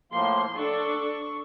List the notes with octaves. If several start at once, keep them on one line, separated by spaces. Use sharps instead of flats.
A2 F3 A#3 C6
D4 A4 C#6